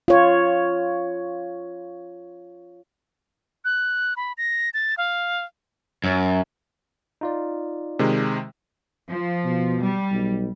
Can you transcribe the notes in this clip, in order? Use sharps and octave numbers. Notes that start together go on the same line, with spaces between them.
F4 C#5
F#6
B5
A#6
A6
F5
F#2
D#4 F4 D5
C3 D#3 G#3
F3
B2
G3
B1